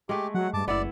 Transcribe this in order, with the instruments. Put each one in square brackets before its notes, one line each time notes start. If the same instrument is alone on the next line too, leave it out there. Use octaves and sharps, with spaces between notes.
[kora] G#3 A3 [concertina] G4
[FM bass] F#3 [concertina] F#5
[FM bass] G2 [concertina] A5 D6
[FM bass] F#1 [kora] B3 E4 [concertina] D5